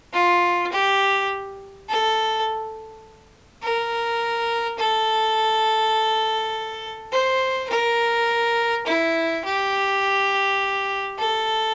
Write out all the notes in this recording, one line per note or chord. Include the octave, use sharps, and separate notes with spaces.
F4
G4
A4
A#4
A4
C5
A#4
E4
G4
A4